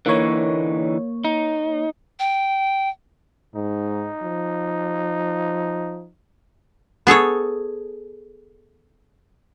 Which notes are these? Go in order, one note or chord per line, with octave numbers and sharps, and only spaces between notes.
D3 E3 A#3 D#4 C#5
D#4
G5
G#2 D#4
F3
B3 G#4 A4 C#5